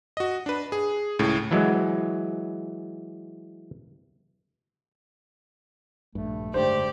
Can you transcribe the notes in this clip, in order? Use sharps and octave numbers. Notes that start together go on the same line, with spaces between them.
F#4 D#5
D4 B4
G#4
C#2 A2 C#3
E3 F#3 G#3
A#1 G2 A3
F#1 G#2 D3 G4 C5 D5